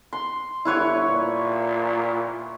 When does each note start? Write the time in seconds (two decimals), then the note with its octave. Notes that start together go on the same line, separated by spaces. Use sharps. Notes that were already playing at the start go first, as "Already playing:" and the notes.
0.13 C6
0.65 G1 E4 B4 C#5
1.10 A#2